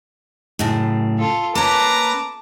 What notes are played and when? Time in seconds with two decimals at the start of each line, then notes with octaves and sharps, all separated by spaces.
0.59 F#2 A2 C#3
1.18 F4 A4
1.55 A#3 C#4 B4 A5 A#5 D6